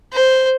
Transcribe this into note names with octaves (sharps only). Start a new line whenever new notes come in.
C5